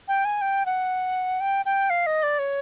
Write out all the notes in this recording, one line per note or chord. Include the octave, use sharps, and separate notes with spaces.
G5
G#5
G5
F#5
G5
G5
F5
D#5
D5
C#5